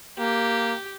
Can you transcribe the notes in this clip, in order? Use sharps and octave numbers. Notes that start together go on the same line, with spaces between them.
A#3 G4